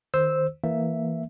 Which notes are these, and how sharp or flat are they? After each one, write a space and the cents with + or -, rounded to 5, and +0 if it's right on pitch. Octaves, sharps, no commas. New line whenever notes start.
D#3 -10 C5 +0 E6 -10
E3 +0 A#3 -10 E5 +0